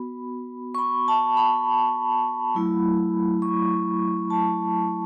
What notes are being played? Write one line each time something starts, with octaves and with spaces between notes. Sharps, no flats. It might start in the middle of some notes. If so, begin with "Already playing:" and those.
Already playing: B3 F#4 B5
C#6
B5
A5
B5
F#3 A3 E4
C#6
A5